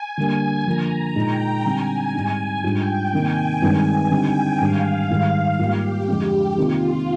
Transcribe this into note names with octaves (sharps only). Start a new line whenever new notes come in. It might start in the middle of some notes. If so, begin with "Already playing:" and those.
Already playing: G#5
D3 G3 A#3
D3 F3 A#3 A#5
A#2 G#3 D#4 G5
D3 G3 C4 G#5
G#2 G3 C4 D#4 G#5
G#2 G3 D4 F4 G5
C3 D#3 A#3 D#4 G#5
G2 D#3 G#3 C4 D#4 G#5
D3 G3 C4 D#4 G5
G#2 D#3 G3 D4 F5
G#2 D#3 G3
G#2 G3 A#3 F4 G4
F2 D3 G#3 C4
C3 D#3 A#3 D#4 F4